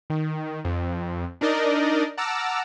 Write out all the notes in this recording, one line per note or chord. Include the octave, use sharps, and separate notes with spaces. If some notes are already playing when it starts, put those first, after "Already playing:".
D#3
F2
D4 D#4 A#4 D5 D#5
F#5 A5 A#5 D6 E6 F6